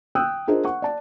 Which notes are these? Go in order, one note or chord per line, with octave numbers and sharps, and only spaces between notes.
G5 D#6 E6 F#6
D4 F4 G#4 A#4 C5 D#5
F#5 C#6
D5 A5